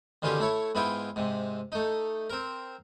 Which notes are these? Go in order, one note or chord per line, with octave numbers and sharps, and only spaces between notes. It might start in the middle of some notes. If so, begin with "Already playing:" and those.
B2 D3 D#3 C#4 F4 G4
A3 E4 C#5
G#2 B3 E4 F4 D#5 G5
G#2 C3
A3 D#4
C4 A#4